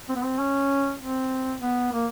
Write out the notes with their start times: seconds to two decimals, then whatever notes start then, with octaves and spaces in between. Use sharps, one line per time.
0.09 C4
0.16 B3
0.23 C4
0.39 C#4
1.00 C4
1.62 B3
1.93 A#3